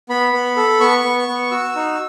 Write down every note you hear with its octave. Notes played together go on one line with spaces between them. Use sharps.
B3 B5
B3
A4
B3 C#6
B3
B3
F#4 E6
D#4